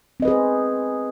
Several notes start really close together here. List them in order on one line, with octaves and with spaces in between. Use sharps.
C4 D#5 B4 G#4 C5